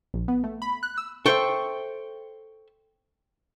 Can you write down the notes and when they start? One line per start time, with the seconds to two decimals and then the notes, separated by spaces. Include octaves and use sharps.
0.14 A#1
0.28 B3
0.44 A3
0.62 B5
0.83 F#6
0.98 E6
1.26 A4 C5 E5 G5 C#6